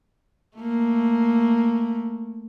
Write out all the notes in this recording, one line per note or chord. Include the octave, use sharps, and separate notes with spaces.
A3 A#3